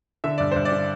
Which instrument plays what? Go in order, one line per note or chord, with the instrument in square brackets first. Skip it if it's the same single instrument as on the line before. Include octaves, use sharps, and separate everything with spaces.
[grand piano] D3 E5
G2 D5
G2 C5
D5
D3